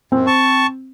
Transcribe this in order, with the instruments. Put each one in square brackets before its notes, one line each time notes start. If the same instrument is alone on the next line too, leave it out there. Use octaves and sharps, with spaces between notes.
[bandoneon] F#2 [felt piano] C4
[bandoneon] A5 C#6